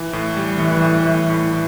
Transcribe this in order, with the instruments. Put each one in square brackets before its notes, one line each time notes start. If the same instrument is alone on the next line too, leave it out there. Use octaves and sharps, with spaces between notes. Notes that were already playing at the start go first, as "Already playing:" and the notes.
Already playing: [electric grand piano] E3
A2
G3
[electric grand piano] A2 [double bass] E3
[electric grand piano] A2
A2
A2
E3